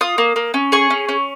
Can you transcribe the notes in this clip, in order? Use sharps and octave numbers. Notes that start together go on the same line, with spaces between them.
F4 D#6
A#3
A#3
C#4
G#4 C#6
C#4
C#4